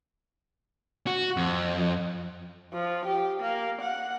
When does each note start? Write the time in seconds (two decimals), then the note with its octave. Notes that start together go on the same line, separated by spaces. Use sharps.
1.07 F#4
1.37 F2
2.73 F3
3.06 G4
3.41 A#3
3.82 F#5